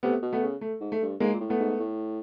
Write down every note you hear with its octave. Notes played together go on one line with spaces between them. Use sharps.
C3 A3 B3
B2
A3 B3
C#3
A3
G#2
A3
G2
G#2 G#3 A#3
A#2
A2
A3 B3
G#2
A2